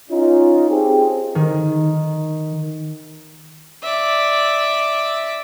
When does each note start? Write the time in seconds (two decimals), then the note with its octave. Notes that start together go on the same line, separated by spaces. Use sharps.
0.11 C#4 D#4 F4
0.70 C4 G4 G#4
1.35 D#3
3.83 D5 E5